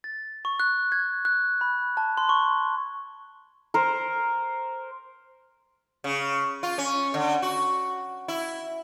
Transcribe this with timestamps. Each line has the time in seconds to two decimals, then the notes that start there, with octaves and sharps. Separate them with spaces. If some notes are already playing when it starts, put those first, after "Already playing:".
0.04 A6
0.45 C#6
0.60 F#6
0.92 G#6
1.25 F#6
1.61 B5
1.97 A5
2.17 C6
2.29 C#6
3.74 A#4 C5
6.04 C#3
6.63 F4
6.78 C#4
7.14 D3
7.42 F#4
8.28 E4